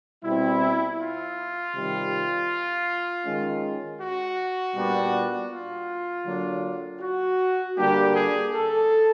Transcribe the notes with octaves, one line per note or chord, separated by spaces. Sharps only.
B2 G3 C4 E4
F4
C3 D#3 G3
D#3 G#3 C#4
F#4
A#2 G3 B3 D4
F4
D3 F#3 A#3 D4
F#4
D3 G3 A#3 D4 G4
G#4
A4